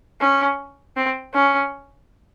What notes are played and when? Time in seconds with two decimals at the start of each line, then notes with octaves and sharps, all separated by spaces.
0.21 C#4
0.96 C4
1.34 C#4